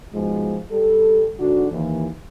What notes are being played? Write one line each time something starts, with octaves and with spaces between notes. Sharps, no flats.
G#2 B2 F3 G#3
G3 A4
G#2 D3 D4 F#4
D#2 E3